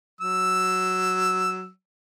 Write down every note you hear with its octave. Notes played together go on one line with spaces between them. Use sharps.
F#3 E6